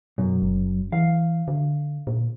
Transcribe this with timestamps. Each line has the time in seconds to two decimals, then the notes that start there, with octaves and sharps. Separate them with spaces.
0.18 F#2 B2
0.42 F#1
0.92 E3 F5
1.48 D3
2.07 A#2